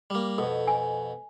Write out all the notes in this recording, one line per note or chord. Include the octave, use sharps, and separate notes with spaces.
G3 A#3
F2 B2 A4
G#5